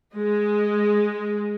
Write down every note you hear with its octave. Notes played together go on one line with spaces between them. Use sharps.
G#3